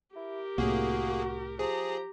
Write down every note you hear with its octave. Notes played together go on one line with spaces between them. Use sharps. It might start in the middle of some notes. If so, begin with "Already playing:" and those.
E4 G4 A#4
C2 A2 A#3 F#4 G#4
F3 G4 G#4 A#5